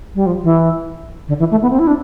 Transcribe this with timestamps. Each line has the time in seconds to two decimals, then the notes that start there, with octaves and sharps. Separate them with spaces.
0.15 G3
0.26 F3
0.43 E3
1.28 D3
1.39 E3
1.51 A3
1.62 B3
1.71 C4
1.79 E4
1.87 D4